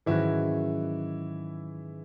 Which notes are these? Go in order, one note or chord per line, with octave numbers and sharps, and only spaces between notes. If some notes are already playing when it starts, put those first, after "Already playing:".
G#2 D#3 E3 F#3 C#4 E4 F#4